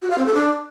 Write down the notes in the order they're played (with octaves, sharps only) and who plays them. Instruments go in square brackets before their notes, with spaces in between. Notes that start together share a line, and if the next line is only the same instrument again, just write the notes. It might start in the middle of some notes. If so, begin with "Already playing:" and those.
[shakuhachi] F#4
F5
C4
A4
D4